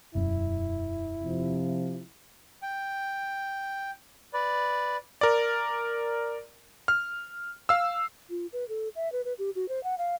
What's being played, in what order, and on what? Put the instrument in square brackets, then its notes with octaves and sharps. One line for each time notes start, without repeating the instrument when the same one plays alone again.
[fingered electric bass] E1 F#2 C#4 [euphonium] E4
[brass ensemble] C3 F3
[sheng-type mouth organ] G5
B4 D5
[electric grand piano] A#4 D5
F6
F5 E6
[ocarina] F4
B4
A4
E5
B4
B4
G4
F#4
C5
F#5
F5